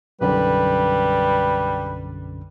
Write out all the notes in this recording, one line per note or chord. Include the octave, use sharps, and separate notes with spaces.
B1 F#2 D3 G3 B4